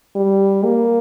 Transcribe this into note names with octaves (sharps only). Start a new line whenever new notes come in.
G3
A#3